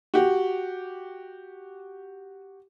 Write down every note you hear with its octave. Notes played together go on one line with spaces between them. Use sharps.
F#4 G4